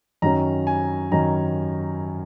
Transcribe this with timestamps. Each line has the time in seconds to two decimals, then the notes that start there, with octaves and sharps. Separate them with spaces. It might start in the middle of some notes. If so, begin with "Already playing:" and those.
0.22 F#2 D#3 F#3 C#4 A#5
0.67 G#5
1.12 F#2 D#3 F#3 C#4 A#5